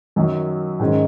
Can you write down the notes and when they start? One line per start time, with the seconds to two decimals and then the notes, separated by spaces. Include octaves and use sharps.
0.16 F#2 D#3 F#3
0.80 G#2 D#3 G#3 C#4